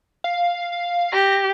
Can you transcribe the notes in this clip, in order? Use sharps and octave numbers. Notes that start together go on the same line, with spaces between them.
F5
G4 A#6